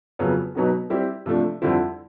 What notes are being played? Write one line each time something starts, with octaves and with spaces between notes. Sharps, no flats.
F2 C#3 F#3 B3
B2 F#3 B3 D#4 F#4
G3 C4 E4 G4
C3 F3 A3 D4
F2 D3 G3 C4 E4